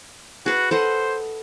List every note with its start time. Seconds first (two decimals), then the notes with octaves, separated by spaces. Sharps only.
0.46 F#4 G#4 B4
0.71 A4 C5 D#5 F#5